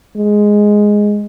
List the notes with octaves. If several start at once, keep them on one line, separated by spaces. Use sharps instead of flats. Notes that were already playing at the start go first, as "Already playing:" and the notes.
G#3